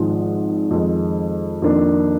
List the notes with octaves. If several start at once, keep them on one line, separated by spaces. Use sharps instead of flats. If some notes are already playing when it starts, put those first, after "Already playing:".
Already playing: G#1 G#2 F3 G#3
F2 D#3 G#3
F2 D#3 A#3 D4